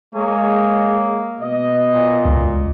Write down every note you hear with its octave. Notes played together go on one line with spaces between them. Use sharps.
G#3 A#3 C#5 D#5 G#5
B2 D#5
A#2
C#2